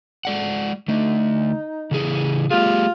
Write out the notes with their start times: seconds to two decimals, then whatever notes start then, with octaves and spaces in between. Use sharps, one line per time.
0.25 G#3 D5 F#5
0.88 D3 A3 D#4
1.91 C#3 E3 G#4
2.51 A3 F4 G4 G#4